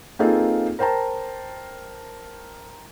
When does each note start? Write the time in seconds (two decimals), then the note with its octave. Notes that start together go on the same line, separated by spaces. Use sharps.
0.19 A#3 C4 D#4 F4 G#4 A4
0.79 A#4 C5 G5 A5 A#5